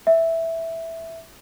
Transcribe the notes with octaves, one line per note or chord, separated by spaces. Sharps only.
E5